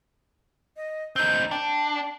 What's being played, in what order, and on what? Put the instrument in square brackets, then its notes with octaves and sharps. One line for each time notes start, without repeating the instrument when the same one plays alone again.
[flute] D#5
[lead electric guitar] C4 D#4 [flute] G6
[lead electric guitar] D4 [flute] G5